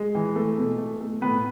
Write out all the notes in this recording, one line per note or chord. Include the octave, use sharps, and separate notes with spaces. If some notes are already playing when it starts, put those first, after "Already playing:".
Already playing: G#3
E3
A3
B2
A3
A3
A2 B3 B4